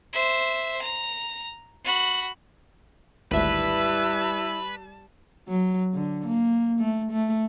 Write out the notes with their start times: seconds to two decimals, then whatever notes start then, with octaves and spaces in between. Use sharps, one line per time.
0.13 C5 E5
0.81 A#5
1.84 F#4 B5
3.32 G#1 D2 G3 E4 B4 E5 A5
5.48 F#3
5.94 D3
6.26 A#3
6.80 A3
7.11 A3